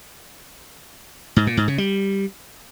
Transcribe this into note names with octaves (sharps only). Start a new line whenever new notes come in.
G#2
A#2
G#2
C#3
G3